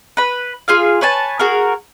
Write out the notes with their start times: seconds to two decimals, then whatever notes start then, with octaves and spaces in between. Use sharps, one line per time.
0.17 B4 B5
0.68 F4 G#4 F5
1.01 B4 C#5 G#5 A5
1.39 F#4 G#4 A#4